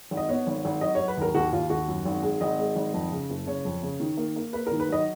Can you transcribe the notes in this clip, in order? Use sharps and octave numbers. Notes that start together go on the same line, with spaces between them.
G#1
D#5
B3 C#5
G#1
G#1
F#3 D#5
F#3 C#5
B4
D#2 A#4
D#2 F#4
D#2 F4
D#2 F#4
F#2
G#1
G#3
G#1 D#5
G#3
G#1
F2
C#3
F#1
C#3 C#5
F2
C#3
D#3
A#3
A#3
A#3 B4
A#4
D#3
B4
F#3 D#5